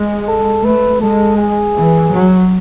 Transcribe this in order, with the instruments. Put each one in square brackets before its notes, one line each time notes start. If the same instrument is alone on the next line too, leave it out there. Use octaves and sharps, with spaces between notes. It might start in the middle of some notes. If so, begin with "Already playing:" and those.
Already playing: [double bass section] G#3
[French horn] A4
[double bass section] A3 [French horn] B4
[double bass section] G#3 [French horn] A4
[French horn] G#4
[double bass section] E3
F#3